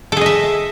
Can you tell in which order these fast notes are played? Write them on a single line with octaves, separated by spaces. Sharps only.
A4 G#4 D#5 E5